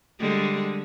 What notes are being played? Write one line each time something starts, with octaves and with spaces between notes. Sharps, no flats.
D3 G3 G#3